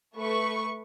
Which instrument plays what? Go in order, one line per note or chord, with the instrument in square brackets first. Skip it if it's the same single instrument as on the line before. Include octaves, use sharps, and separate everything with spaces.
[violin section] A3 B4 C#6